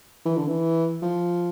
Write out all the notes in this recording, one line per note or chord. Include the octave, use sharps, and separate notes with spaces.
E3
D3
E3
F3